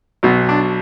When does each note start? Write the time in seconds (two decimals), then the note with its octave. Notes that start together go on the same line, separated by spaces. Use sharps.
0.23 B1 B2 F#3
0.49 D4